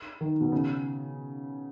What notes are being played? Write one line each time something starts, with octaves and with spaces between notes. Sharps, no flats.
D#3
B2
C#3